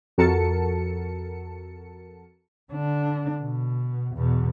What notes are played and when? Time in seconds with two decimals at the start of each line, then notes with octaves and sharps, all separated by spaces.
0.18 F2 F#4 A4 A#4 A5 C#7
2.72 D3 D4
3.41 B2
4.15 E2 B2